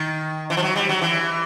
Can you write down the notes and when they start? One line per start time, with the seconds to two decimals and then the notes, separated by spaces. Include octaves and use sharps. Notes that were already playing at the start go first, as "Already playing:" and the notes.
Already playing: D#3
0.50 E3
0.57 F3
0.63 F#3
0.76 G3
0.89 F#3
1.01 E3